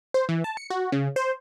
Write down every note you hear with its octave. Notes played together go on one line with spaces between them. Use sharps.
C5
E3
A5
C#7
F#4
C#3
C5